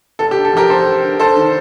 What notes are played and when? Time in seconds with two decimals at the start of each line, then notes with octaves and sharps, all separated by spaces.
0.19 F1 A4
0.31 G4
0.36 D3
0.45 A4
0.53 F2 G4 A#4
0.70 F1 A4 C5
0.86 F1
1.03 D3
1.20 F1 A4 C5
1.36 D#3